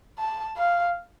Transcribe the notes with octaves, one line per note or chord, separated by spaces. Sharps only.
A5
F5